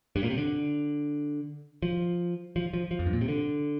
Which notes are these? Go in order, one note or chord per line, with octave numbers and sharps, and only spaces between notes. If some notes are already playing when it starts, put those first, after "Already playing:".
G2
A#2
C3
D3
F3
F3
F3
F3
F2
G2
A#2
C3
D3